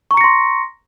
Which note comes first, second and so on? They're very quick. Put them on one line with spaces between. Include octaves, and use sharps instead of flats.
C#6 A#5 C#7 A#6 C6